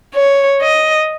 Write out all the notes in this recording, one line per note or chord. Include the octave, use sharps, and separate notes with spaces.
C#5
D#5